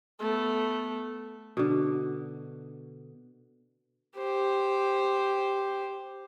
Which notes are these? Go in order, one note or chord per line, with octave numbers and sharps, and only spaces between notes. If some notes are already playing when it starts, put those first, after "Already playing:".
A3 B3
B2 D3
G4 C5